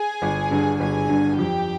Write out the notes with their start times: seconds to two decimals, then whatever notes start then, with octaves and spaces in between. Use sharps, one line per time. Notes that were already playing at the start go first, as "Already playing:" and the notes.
Already playing: G#4 G#5
0.22 G1
0.51 G2 D3
0.80 G1 G#4 G#5
1.09 G2 D3
1.37 F2 G4 G5